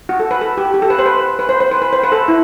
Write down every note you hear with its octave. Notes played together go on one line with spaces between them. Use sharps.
F#4
A4
B4
A4
G4
G4
A4
B4
C5
B4
B4
C5
C5
B4
B4
C5
B4
A4
E4